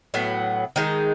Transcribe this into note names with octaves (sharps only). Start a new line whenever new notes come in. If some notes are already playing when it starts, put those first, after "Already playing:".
A2 F#3 B3
D#3 G#3 D#4